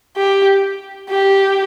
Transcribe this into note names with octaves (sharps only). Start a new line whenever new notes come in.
G4
G4